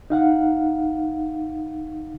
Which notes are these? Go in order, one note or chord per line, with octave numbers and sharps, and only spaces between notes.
D#4 F5 F#5